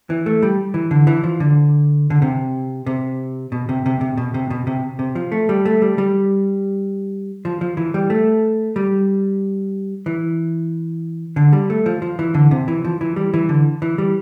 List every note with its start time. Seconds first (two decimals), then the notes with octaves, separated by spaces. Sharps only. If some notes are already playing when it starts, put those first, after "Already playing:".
0.10 E3
0.26 A3
0.42 G3
0.74 E3
0.91 D3
1.07 E3
1.24 F3
1.40 D3
2.10 D3
2.22 C3
2.86 C3
3.52 B2
3.69 C3
3.86 C3
4.01 C3
4.17 B2
4.34 C3
4.50 B2
4.67 C3
4.99 C3
5.15 F3
5.32 A3
5.49 G3
5.65 A3
5.82 G3
5.98 G3
7.45 F3
7.61 F3
7.77 E3
7.94 G3
8.10 A3
8.76 G3
10.06 E3
11.36 D3
11.53 G3
11.70 A3
11.86 F3
12.02 F3
12.19 E3
12.34 D3
12.51 C3
12.68 E3
12.84 F3
13.01 E3
13.16 G3
13.34 E3
13.49 D3
13.82 E3
13.98 G3